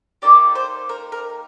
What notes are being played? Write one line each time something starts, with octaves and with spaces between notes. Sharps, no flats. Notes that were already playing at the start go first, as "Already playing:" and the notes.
A#3 D#4 G4 D5
C5
A#4
A#4